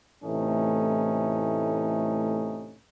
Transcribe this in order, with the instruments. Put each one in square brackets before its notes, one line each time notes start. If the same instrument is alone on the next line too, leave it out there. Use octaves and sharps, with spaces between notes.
[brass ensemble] A2 C3 E3 A3 C#4 D#4